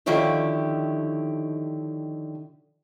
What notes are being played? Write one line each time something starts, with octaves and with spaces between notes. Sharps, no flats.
D3 D#3 F3 E4 G4 C#5